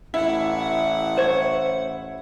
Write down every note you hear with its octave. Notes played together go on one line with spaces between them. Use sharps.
A1 E4 F#5
C5 C#5